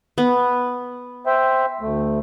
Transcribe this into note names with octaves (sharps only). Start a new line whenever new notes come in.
B3
C5 E5 G5
D2 A3